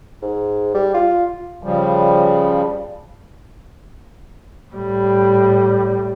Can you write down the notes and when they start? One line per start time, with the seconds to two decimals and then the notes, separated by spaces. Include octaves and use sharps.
0.22 G#2
0.75 G3
0.94 F4
1.63 C#3 F3 G3
4.72 A2 G3